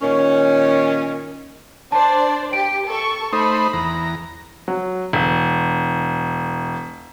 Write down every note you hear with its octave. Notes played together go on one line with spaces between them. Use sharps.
A#2 D#3 C#4
D4 C5 D5 A5
G4 G5 D7
A4 C#6
A3 D#4 C5 B5 D#6
E2 A#5
F#3
E1